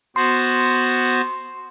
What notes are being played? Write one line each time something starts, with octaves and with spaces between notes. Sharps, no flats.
B3 F#4 C5 C6